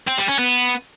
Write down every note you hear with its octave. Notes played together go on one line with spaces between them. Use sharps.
C4
G3
C#4
B3